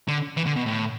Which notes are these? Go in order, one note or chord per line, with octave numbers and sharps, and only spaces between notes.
D3
E3
D3
B2
A2